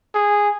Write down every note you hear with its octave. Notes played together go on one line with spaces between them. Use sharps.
G#4